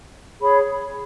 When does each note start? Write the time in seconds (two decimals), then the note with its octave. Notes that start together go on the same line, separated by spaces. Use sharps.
0.40 G#4 C#5 B5